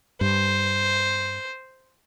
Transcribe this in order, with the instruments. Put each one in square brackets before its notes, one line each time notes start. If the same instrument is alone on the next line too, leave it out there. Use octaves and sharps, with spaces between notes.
[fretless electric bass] G2 [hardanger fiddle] C5